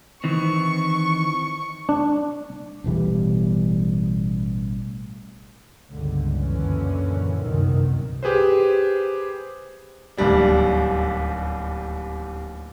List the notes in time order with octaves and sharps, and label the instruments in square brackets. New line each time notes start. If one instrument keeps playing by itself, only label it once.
[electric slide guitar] D#3 E3 C4 [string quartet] C#6
[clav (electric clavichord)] D4
[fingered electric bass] A1 B2 E3 G3
[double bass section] G1 C#2 D3
F#2 A#2 D3 E3 C#4
G1 C2 F#2 D#3
[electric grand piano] G4 G#4 B4 C5
[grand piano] D1 D#2 G3 D4